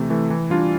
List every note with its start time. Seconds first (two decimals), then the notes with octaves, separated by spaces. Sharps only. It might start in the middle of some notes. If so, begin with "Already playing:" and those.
Already playing: C3 E3 A3
0.10 E3 A3
0.30 E3
0.50 G3 D4 F4